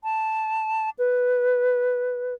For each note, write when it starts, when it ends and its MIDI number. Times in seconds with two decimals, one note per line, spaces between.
0.04 0.90 81
0.99 2.34 71